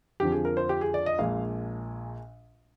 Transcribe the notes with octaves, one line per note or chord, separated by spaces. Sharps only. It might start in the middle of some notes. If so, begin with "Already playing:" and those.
F2 D3 F3 G4
G#4
A#4
C5
G4
G#4
D5
D#5
A#1 A#2 G#3 F5